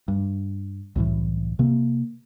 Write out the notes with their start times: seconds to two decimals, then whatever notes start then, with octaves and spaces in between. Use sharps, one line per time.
0.08 G2
0.96 C2 F#2 A2 E3
1.59 C3 A#3